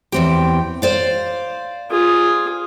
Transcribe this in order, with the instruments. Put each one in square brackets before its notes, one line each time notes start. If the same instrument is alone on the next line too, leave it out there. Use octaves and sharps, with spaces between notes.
[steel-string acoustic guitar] E2 C4 G4
C5 D5 F5
[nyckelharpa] F4 G#4